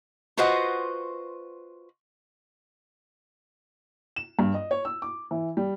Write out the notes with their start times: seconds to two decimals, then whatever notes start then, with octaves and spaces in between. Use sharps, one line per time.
0.37 F4 F#4 B4 C5 D#5 F#5
4.16 E7
4.39 G2
4.54 D#5
4.71 C#5
4.85 E6
5.02 D6
5.31 E3
5.57 G3